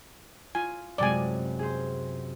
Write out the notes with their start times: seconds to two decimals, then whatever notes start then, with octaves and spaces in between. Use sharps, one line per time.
0.55 F4 G#5
0.98 F#2 C3 G#3 D5 G#5
1.59 G#4 C5